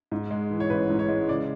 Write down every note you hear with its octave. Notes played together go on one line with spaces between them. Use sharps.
G#2
G#3
E3
C#5
A1 B4
G#2
C#5
G#3
C#3 D5